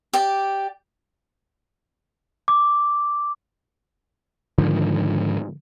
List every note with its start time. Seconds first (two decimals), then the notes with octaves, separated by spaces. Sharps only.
0.13 G4 D5
2.48 D6
4.58 G#2 D3 D#3 F3